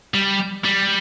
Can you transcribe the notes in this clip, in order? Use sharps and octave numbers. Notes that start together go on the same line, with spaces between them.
G3
G3